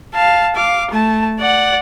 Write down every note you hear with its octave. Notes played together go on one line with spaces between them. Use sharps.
F5 A5
F5 D6
A3 A5
D5 F#5